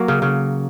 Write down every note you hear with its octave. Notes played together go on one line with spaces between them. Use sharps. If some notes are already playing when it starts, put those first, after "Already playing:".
Already playing: F#3 A#3
C#3
C#3